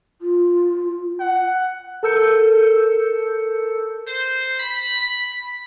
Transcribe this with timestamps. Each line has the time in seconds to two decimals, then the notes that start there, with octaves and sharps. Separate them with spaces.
0.21 F4
1.20 F#5
2.03 A4 A#4 E6 G6 C#7
4.08 C5
4.60 B5